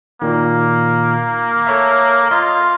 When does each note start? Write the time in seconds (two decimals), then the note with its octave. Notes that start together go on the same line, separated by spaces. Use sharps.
0.22 A#2 D#3 A#3
1.67 A4 C#5 E5
2.31 F4 D#5